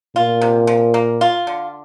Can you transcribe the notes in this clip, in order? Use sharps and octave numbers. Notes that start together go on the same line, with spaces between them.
A#2 F4
C3
F3
A#3
F4
D3